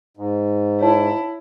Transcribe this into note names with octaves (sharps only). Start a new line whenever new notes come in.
G#2
E4 C#5 A5